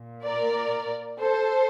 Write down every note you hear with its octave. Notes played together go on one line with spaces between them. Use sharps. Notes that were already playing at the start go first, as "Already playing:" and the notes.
Already playing: A#2
A#4 D5
A4 C5